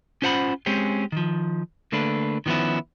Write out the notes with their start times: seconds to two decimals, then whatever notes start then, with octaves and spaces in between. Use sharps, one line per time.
0.22 C#4 F4 C5 F#5 G5 B5
0.66 G#3 C4 C#4 G4 G#4
1.12 D#3 F3
1.92 D3 A3 A#3 D4 B4
2.46 D#3 F3 B3 C#4 E4